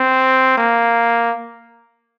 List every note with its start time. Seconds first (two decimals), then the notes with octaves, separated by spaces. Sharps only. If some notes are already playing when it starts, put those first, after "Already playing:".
Already playing: C4
0.58 A#3